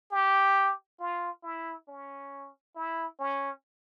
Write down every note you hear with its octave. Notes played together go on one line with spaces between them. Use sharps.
G4
F4
E4
C#4
E4
C#4